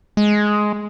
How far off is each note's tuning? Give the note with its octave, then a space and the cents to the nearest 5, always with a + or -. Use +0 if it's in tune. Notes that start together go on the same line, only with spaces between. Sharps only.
G#3 +10